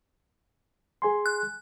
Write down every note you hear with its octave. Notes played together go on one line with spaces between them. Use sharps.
G#4 G#5 C6
F#6